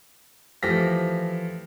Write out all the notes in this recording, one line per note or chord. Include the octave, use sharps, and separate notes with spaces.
E3 F3 A3 G4 A#6 B6